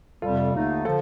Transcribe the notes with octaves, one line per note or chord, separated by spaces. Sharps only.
F2 C3 G3 F4 A4
D#2 D3 A3 D#4
D3 F3 F4 A4